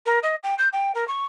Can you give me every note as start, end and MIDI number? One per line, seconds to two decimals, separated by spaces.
0.06 0.19 70
0.23 0.35 75
0.43 0.54 79
0.58 0.68 91
0.72 0.92 79
0.94 1.07 70
1.07 1.24 85